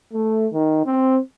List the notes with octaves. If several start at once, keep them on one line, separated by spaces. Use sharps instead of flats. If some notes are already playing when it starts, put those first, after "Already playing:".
A3
D#3
C4